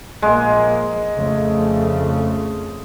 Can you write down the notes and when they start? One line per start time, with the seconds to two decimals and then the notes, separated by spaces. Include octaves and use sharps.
0.22 A#1 G#3 A#3
1.16 F2 C#3 A3